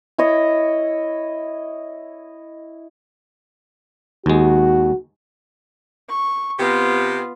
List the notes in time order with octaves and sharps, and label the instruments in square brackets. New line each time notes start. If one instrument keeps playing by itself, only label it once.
[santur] E4 C#5 D#5
[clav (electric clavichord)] D#2 G#3 [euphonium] F#4
[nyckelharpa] C#6
[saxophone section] C3 G4 [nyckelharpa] B3 F4